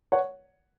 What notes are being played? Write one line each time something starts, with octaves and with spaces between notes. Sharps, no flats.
C#5 F#5